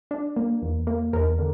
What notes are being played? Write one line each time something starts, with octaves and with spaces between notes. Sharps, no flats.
D4
A#3
E2
A#3
E2 A#4
D3